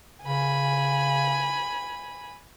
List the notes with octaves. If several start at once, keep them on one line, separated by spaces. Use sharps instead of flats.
C#3 G#5 B5